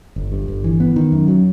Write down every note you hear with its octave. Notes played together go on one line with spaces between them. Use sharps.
G1
G2
G1
E3
B3
D#3
F#2
F#3